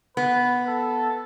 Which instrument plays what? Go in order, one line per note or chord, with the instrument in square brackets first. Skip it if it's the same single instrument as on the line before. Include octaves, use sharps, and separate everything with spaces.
[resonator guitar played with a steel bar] B3 [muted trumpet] B4
[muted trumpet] A4